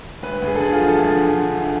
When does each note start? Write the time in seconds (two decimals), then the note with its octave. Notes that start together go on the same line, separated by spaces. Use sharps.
0.23 D2 B4
0.42 D2
0.47 G#4
0.56 A4
0.60 D3 G#4
0.73 F4
0.79 F3
0.88 A4
0.97 D2 G#4
1.16 D3
1.34 D3
1.53 D3